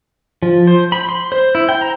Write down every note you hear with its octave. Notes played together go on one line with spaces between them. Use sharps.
F3
C5
B5
C6
C5
E4
G5
A#5